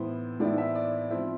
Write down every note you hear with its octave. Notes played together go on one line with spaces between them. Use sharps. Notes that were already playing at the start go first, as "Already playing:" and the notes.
Already playing: A2 E3 B3 E4 C5
A2 E3 B3 E4 D5
E5
D5
F3 C4 E4